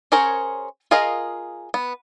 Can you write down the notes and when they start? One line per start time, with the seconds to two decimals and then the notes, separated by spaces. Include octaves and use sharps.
0.12 C#4 G#4 A#4 C5 C#5
0.91 F4 G#4 A#4 D#5 F5
1.74 B3